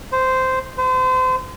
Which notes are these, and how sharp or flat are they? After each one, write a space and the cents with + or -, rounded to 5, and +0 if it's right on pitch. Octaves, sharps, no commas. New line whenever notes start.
C5 -10
C5 -35